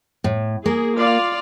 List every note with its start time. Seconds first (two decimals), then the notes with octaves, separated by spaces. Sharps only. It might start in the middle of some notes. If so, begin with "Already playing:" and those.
0.24 A2
0.66 A#3 G#4
0.97 F4 D5 F5